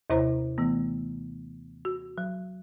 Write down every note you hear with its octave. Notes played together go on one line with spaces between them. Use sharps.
D#2 C3 E4 C5 C#5 A#5
E3 A3 B3
F#4
F#3